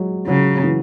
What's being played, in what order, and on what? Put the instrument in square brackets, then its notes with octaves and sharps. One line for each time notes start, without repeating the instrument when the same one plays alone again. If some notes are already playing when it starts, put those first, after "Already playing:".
Already playing: [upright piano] F#3 G#3
[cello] C#3 [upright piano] F#3
[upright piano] E3